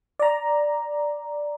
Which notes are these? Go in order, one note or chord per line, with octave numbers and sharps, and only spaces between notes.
D5 A#5